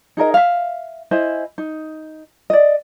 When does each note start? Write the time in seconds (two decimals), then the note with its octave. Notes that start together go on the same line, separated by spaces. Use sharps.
0.17 D#4 G#4 A#4 D#5
0.34 E5 F5
1.11 E4 C5 D#5 G#5
1.58 D#4
2.50 D5 D#5